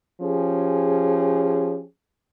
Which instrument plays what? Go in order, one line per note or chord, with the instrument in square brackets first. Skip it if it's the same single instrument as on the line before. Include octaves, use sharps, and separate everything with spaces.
[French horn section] F3 C#4 G4 G#4